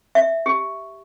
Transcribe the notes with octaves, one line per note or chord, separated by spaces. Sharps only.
E5
G4